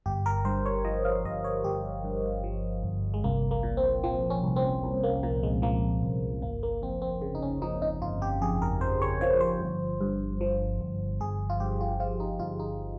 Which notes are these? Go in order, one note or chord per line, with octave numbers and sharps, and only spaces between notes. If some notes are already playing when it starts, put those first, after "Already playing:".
G1 G4
A#4
G2 C5
C#5
F3 D#5
F5
G1 D#5
C#5
G1 G4
G2
F3
G1
G#3
C2 A#3
A#3
A#2
C4
F3 C4
C#4
C2
C4
C2
A#3
A#2 A#3
G#3
F3 A#3
C2
G1 A#3
A#3
F2 C4
C4
C#3
D#4
C#4
F3 D#4
D#4
G1 F4
G4
F2 G#4
A#4
C#3 C5
C#5
F3 C#5
C5
G1
G2
F3
G1
G1 G#4
F4
G2 G4
F4
F3 F4
D#4
G1 F4
D#4